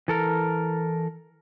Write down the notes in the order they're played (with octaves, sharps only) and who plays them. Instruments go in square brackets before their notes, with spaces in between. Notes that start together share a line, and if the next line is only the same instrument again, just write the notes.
[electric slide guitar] E3 A4 A#4